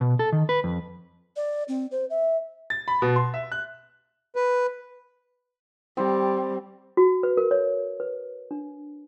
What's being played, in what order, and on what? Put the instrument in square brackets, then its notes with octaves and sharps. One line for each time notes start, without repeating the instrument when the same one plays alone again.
[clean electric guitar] B2
A4
D#3
B4
F2
[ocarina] D5
C4
C5
E5
[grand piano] A6
B5
B2
C6
E5
F#6
[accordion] B4
[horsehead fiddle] G3 [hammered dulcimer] C4
[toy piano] F#4
B4
A#4
C#5
B4
D4